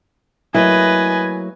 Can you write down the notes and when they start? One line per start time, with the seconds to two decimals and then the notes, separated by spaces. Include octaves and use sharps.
0.55 F#3 A3 A#3 E4 B4 D#5 G#5